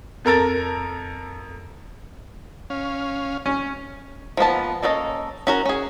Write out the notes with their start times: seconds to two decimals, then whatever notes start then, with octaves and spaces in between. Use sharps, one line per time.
0.25 F2 A4 A#4 A#5 A6
2.70 C#4 F5
3.46 C#4
4.37 F3 A#3 B3 A5
4.82 A#3 C#4 A4 A#4 D#5
5.47 C#4 F#4 A#4
5.65 C#4 G#4